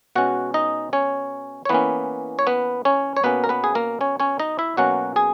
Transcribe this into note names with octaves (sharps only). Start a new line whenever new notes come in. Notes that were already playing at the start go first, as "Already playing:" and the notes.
B2 G#3 C#4 F#4 F#5
D#4 D#5
C#4 C#5
C#5
E3 A#3 B3 C#4 B4
C#5
B3 B4
C#4 C#5
C#5
B2 A#3 B3 C#4 B4
A#4
B3 B4
G#4
A#3 A#4
C#4 C#5
C#4 C#5
D#4 D#5
E4 E5
B2 F#3 A#3 C#4 F#4 F#5
G#4 G#5